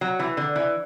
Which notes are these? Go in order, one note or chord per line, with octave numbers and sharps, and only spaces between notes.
F#3
E3
D3
E3